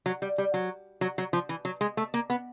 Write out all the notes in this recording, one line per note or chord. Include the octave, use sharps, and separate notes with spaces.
F#3
G3
G3
F#3
F#3
F#3
F3
E3
F#3
G#3
A3
A#3
B3